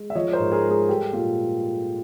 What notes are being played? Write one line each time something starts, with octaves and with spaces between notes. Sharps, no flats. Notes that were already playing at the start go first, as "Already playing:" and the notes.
Already playing: G#3
E5
F3 C#5 D#5
C#5
A#4 C5
G#2
G#4 A#4
G#3
G#4 A#4
G3 G4 A4
A#2 F4 G4